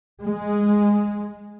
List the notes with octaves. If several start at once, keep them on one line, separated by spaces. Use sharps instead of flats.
G#3